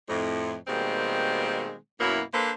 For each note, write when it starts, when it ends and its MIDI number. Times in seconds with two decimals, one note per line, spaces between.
0.09 0.55 41
0.09 0.55 45
0.68 1.75 47
0.68 1.75 51
0.68 1.75 55
0.68 1.75 56
0.68 1.75 58
0.68 1.75 60
2.01 2.21 42
2.01 2.21 47
2.01 2.21 54
2.01 2.21 58
2.01 2.21 64
2.34 2.51 58
2.34 2.51 62
2.34 2.51 69
2.34 2.51 71
2.34 2.51 72